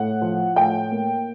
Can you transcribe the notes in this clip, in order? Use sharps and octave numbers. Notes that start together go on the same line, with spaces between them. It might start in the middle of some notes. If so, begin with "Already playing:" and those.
Already playing: A2 F#5
F3
A2 G5
A#3